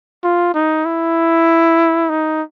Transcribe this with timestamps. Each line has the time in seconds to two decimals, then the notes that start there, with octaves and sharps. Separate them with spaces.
0.24 F4
0.54 D#4
0.85 E4
2.09 D#4